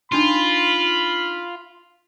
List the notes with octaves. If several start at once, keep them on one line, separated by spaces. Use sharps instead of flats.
D4 D#4 F4 B5 C6